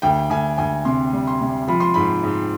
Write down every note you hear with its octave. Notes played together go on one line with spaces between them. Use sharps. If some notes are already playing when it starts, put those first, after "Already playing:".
D2 G5
D2 G#5
D2 G#5
C3 C6
G3
C6
C3
F3 B5
C6
G#2 B5
G#2